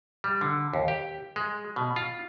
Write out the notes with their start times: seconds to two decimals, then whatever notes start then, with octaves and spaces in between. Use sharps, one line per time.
0.24 G3
0.41 D3
0.73 D#2
0.88 G4
1.36 G#3
1.76 B2
1.96 F4